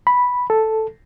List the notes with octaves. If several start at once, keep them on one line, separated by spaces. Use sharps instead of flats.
B5
A4